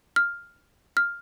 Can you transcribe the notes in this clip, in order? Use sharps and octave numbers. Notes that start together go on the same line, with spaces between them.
F6
F6